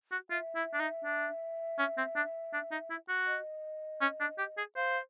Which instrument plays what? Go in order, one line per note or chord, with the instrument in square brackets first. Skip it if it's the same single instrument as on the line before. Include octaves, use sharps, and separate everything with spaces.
[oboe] F#4
[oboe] F4 [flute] E5
[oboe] E4
D4
D#4
D4
C#4
C4
D4
D4
D#4
E4
F#4
[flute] D#5
[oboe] C#4
D4
G4
G#4
[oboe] C5 [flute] F5